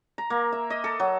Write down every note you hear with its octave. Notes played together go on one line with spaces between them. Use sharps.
A#5
A#3
E5
D#5
A4
F#3